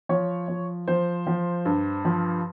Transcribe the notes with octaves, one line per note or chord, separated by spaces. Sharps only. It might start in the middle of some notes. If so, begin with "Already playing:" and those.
F3 C#5
F3
F3 C5
F3
G2
F3